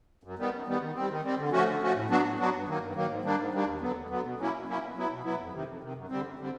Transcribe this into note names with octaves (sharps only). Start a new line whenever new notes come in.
F#2
D#3 G3 B3
F#2
D#3 G3 B3
D#3
G3 C4
D#3
G3 C4
D3
F3 A3 C#4 F#4
D3
F3 A3 C#4 F#4
A2
F#3 B3 D4 F#4
A2
F#3 B3 D4 F#4
G2
D#3 F#3 A#3
G2
D#3 F#3 A#3
G#2
D#3 G3 A#3 D4
G#2
D#3 G3 A#3 D4
D#2
D3 F#3 B3
D#2
D3 F#3 B3
B2
F#3 A#3 C#4 E4
B2
F#3 A#3 C#4 E4
B2
F#3 B3 E4
B2
F#3 B3 E4
F2
C3 D#3
F2
C3 D#3
F#2
D3 G3 C4
F#2
D3 G3 C4